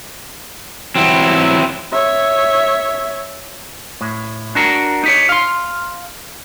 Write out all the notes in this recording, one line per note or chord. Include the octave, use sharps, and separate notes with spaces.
E3 F#3 C4 E4
C#5 E5
A2
D4 F#4 A#4
D#4 G4 C#5
F5 C6